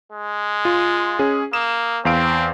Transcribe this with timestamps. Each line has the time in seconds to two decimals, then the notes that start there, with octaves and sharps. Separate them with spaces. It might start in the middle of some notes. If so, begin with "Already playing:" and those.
0.13 G#3
0.65 F4
1.19 C#4 G#4
1.53 A#3 D#6 E7
2.05 E2 C4 F5 D7